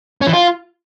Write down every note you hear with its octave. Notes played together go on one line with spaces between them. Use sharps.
C#4
E3
F4